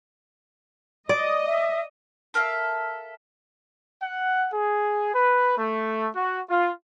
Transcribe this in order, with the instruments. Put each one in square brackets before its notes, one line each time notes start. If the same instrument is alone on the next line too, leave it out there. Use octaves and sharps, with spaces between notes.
[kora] D5 [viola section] D#5
[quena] E5
[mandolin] A4 A#4 E5 F5
[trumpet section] F#5
G#4
B4
A3
F#4
F4